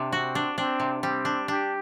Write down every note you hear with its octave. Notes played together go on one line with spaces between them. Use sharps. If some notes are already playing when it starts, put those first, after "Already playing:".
Already playing: C3 D4
C4 F#4
D4
C4 D4
C3
G3 C4
D4
D4 G4